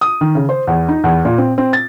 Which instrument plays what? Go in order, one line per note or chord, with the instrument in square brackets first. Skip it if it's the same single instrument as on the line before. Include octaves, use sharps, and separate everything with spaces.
[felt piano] D#6
D#3
C#3
C5
E2
D#4
E2
A#2
C4
C4
A6